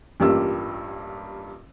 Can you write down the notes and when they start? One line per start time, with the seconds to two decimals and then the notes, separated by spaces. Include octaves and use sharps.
0.20 A1 G2 G3 A#3 F4 E6